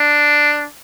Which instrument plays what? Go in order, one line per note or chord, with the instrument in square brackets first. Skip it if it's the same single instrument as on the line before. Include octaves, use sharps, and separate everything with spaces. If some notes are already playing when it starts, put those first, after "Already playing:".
Already playing: [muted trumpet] D4